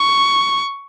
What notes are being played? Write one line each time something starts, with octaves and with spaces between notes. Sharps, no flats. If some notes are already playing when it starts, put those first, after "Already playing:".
Already playing: C#6